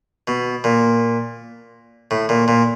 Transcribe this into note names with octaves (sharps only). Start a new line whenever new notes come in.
B2
A#2
A2
A#2
A#2